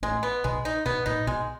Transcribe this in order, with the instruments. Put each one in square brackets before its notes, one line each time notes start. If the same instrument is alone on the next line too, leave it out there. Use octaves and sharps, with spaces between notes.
[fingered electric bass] A1 A2 [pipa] G#3
[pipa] B3
[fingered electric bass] B1 B2 [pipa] G#3
[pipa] D#4
[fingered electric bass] B1 B2 [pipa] B3
[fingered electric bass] A#1 A#2 [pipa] D#4
[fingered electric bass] B1 B2 [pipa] G#3